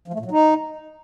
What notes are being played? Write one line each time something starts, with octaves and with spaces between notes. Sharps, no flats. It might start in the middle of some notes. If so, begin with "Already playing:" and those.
F3
A3
A#2
F#3
D#4